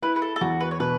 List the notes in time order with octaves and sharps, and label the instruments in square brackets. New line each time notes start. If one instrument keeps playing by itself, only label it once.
[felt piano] E4 [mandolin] B4
[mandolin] B4
A4
A4
[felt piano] E2 [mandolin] F#4
[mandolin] B4
C#5
[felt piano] B2 [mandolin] B4